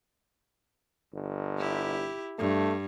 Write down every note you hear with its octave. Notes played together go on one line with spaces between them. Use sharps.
G1
E4 G4
G2 A3